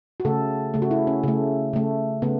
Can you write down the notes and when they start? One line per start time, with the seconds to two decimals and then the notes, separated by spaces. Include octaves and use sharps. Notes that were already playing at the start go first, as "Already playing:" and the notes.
0.20 F#4
0.25 C#3 A3 A4
0.74 C#3 A3
0.82 F#4
0.91 E4
1.07 C#4
1.23 C#3 A3
1.73 C#3 A3
2.22 C#3 A3 B3